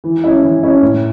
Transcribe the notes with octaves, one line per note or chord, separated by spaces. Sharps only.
E3
C#4 E4
E3
C#4 E4
A2